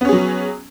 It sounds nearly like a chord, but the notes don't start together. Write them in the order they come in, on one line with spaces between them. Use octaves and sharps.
B3 C#4 G#4 F#3